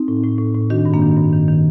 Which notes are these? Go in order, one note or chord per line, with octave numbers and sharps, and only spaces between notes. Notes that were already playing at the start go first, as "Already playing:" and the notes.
Already playing: C4 D#4
A2
A2
A2
A2
D#3 D4 F#4
G2
A#3 D4
D#3
G2
D#3
D#3